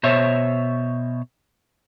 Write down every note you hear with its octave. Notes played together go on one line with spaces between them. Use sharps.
B2 C5 C#5 E5